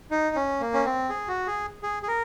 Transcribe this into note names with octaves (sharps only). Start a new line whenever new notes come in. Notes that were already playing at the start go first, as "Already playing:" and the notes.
D#4
C#4
A#3
C#4
C4
G#4
F#4
G#4
G#4
G#4
A#4